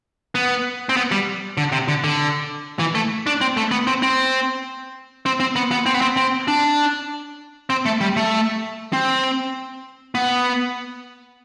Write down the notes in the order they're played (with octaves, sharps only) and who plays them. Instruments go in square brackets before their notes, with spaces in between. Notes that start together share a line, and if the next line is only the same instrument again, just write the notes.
[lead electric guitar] B3
C4
B3
G3
D3
C3
D3
D3
E3
A3
D4
C4
A3
B3
C4
C4
C4
C4
B3
B3
C4
B3
C4
C4
D4
C4
A3
G3
A3
C4
B3